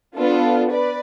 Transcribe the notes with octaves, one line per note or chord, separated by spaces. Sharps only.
B3 D4 F4 A4
B4 D5